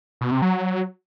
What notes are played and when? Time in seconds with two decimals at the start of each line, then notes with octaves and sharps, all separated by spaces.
0.21 B2
0.31 C3
0.42 F#3